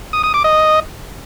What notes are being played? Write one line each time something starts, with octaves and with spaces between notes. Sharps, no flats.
D#6
D#6
D6
D#5